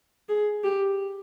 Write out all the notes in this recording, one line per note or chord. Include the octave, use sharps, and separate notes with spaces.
G#4
G4